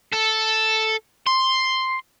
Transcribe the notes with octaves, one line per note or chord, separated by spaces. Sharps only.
A4
C6